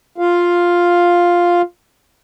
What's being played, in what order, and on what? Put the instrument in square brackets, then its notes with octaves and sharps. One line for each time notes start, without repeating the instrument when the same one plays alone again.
[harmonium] F4 F5